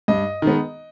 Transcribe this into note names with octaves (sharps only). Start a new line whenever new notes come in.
G2 D#5
D#3 G#3 B3